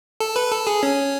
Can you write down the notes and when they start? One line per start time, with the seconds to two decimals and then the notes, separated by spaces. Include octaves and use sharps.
0.20 A4
0.36 B4
0.52 A4
0.67 G#4
0.83 C#4